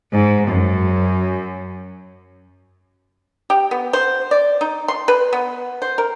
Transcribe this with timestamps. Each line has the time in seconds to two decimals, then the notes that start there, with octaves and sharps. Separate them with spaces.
0.12 G#2
0.49 F#2
3.50 G4
3.71 B3
3.93 C5
4.31 D5
4.61 D#4
4.88 C6
5.08 B4
5.33 B3
5.82 C5
5.98 A#4